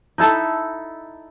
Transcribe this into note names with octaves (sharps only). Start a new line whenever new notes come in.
D#4 E4 A4